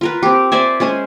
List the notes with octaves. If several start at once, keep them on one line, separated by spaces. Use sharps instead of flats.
F4 A#4 B4
C4 G4
C5 D5 E5 G#5
G#3 C#4 C5 G#5